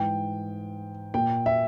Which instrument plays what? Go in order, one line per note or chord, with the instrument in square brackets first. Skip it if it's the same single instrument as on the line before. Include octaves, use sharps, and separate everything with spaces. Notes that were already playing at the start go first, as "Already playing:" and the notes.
Already playing: [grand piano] G#2 E3 G5
A#2 G5
E5